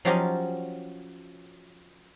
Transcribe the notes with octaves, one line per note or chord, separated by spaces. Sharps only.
F3 F#3 C#4 F4 G4 D#5